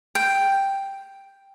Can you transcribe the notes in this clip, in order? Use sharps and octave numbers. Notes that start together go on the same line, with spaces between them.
G5